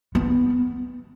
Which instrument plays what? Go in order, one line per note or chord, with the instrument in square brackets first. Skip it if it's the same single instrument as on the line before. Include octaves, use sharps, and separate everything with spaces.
[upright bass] B3